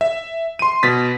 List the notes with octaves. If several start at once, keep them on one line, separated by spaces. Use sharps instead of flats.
E5
C6 D#7
B2 A6 B6